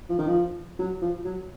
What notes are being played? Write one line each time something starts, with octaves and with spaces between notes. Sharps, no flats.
F3
D#3
F3
F#3
F3
F#3